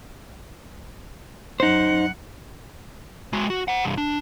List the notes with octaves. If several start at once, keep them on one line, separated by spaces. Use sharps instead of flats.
F#2 D#4 C5 F#5
G#3 F#4
F#4
C5 F#5
C2 G2
D4